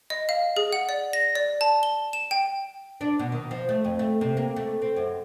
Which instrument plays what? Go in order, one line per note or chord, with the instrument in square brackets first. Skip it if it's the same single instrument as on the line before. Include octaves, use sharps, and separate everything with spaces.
[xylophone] D#5
F5
G#4
F#5
D5
A#6
D5
A5
G7
E7
G5
[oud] D4
B2
D#3
F3
A3
F2
A3
C3
A#3
A3
C4
F#2